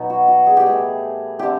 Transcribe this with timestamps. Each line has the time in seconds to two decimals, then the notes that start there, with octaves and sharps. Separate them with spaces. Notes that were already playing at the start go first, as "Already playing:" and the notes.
Already playing: B2 F#3 B3 D#4
0.10 F#4
0.28 F#4
0.47 G#4
0.57 G4
0.66 A2 E3 G3 G#4
1.39 D3 G3 C4 E4 G4